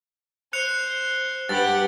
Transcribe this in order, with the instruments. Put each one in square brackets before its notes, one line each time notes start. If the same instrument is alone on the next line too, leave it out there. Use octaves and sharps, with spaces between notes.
[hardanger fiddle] C5 [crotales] F#6 C#7 F7
[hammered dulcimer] G2 [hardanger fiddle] G4 F#5 [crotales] A6